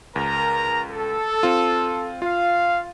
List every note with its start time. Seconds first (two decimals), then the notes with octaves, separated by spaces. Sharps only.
0.16 C#2 A#4 A#5
0.91 A4
1.43 C4 F4
2.22 F4 F5